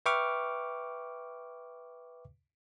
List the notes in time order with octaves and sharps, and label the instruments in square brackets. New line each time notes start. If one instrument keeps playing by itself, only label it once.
[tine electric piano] B4 E5 G5 C#6 D6 F6